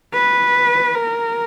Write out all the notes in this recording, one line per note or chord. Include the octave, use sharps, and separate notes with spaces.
B4
A#4